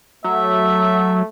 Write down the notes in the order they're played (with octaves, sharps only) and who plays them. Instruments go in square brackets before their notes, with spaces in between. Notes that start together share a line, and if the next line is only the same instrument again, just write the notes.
[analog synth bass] F#3 [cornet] A3 [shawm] E5